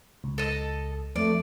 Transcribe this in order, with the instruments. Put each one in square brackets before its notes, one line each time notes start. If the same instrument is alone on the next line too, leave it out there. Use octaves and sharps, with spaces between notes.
[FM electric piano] C#2
[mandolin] A4 D#5
[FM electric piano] F2 [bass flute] A3 [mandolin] D5